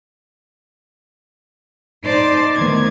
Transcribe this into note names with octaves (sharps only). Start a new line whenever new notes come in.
D#4 C5 D5 A5 C6 D6
D2 D#3 B3 D6 G#6